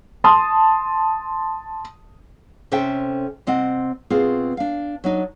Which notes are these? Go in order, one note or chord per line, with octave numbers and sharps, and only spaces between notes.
A5 C6 D#6
C3 C#4 A4 C5 E5 G5
C3 C4 D#5 F#5
B2 C4 F4 G#4
D4 F5
F#3 D4 D#4